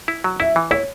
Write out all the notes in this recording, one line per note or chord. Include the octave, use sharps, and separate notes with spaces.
E4
F#3
E4 E5
E3
E4 C#5